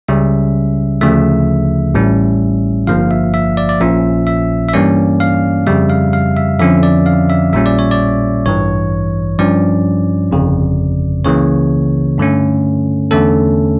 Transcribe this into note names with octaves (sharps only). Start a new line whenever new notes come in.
C#2 C#3 G3 C#4 E5
D2 C#3 F3 A3 E5
A1 A2 G3 C#4
G1 G2 F3 A#3 F5
E5
E5
D5
D5
A#1 A#2 F3 C#4 E5
E5
E5
G2 E3 G3 A#3 C#4 D5
F5
F2 C#3 G3 E5
F5
F5
E5
F2 D3 F3 C#4 E5
D5
F5
E5
A#1 A#2 G3 C#4 E5
D5
C#5
D5
A1 G2 E3 C#5
G2 F3 C#4 D5
G1 F2 C#3
C#2 C#3 E3 A#3 C#5
G2 D3 A3 C#4
E2 D3 A3 C#4 A4